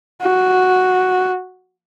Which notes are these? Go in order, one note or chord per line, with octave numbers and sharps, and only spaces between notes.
F#4